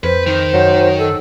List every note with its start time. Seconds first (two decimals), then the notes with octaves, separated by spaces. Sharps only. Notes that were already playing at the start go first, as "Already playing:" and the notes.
0.04 F2 B4 C5
0.27 D#3
0.54 F#2 F#3
0.98 A4